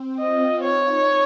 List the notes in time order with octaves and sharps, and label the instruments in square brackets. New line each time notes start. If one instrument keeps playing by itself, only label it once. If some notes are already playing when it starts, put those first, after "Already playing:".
Already playing: [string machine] C4
[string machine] F4 [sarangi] D#5
[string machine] D#4 [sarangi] C#5